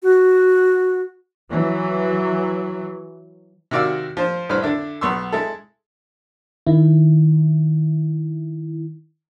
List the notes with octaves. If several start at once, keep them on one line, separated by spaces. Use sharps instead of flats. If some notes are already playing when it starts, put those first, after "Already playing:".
F#4
E3 F#3
C3 D#3 F#4 D5 F5 E6
F3 C5
C2 A2 B4 C5 F6
D3 D4 E4
B1 B3 C6 C#6 E6
G#3 E4 A4
D#3 E4